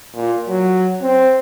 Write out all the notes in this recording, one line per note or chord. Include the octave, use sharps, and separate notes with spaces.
A#2
F#3
C4